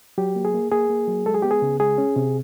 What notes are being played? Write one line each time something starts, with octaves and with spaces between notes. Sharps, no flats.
F#3 G4
A#3
G#4
A#3
A#3 G#4
A#3
F#3
G#3 A4
G#4
B3 G4
G#4
C#3
G#3 G#4
C#4
C3